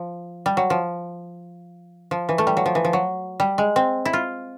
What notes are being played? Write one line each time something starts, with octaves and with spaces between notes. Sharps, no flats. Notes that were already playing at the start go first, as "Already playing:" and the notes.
Already playing: F3
G3
F#3
F3
F3
E3
A3
G3
F#3
F3
E3
F3
F#3
G3
G#3
C4
E4
F4